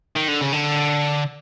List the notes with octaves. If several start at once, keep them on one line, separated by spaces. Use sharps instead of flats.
D#3
D3
C#3
D3